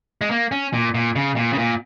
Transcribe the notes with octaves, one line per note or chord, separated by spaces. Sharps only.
G#3
A#3
C#4
A#2
A#2
C#3
A#2
C#3
A#2